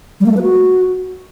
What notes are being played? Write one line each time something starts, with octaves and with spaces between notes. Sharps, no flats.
G3
A#3
A3
B4
F#4